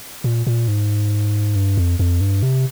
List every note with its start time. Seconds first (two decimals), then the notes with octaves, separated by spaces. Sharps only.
0.24 A#2
0.47 A#2
0.68 G#2
1.56 G2
1.77 F2
1.99 F2
2.21 G2
2.43 C3